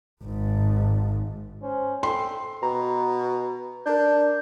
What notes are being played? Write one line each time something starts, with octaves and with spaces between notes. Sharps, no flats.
G#1 G#2
C#4 C5
A4 G5 C6
B2 A#5
D4 A#4 G6